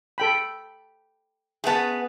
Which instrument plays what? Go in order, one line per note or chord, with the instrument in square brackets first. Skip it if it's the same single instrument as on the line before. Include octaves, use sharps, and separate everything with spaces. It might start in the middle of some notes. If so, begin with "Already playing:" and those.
[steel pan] A4 G5 B5
[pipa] A3 C#4 A5 [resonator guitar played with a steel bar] B3 G#4